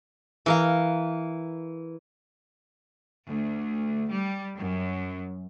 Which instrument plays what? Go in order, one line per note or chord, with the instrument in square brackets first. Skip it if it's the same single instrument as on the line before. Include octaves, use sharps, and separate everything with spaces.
[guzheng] E3 A#4 F5
[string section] D2
G3
F#2